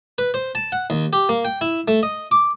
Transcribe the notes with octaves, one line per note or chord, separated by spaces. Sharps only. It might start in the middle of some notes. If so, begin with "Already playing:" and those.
B4
C5
A5
F#5
D#2
G4
A#3
G5
E4
A3
D#5
D6